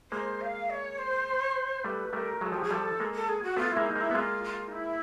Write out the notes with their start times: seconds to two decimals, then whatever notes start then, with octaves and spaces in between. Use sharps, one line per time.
0.11 G#3 A#3 C5
0.41 F5
0.70 C#5
0.98 C5
1.84 G3 A3 B4
2.13 G3 A3 A#4
2.41 F#3 G#3 A4
2.52 F3 G4
2.62 F#3 G#4
2.71 F3 G3 A4
3.00 G#3 A#3
3.14 A4
3.28 G#4
3.43 F#4
3.57 A3 B3 F4
3.71 E4
3.77 G#3 A#3
3.85 D#4
3.96 G#3 A#3 E4
4.11 B3
4.14 G#3 A#3 F4
4.44 F4
4.67 D#4
4.72 E4